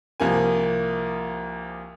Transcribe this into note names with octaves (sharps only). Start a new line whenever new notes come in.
C2 F3 A#3 G#5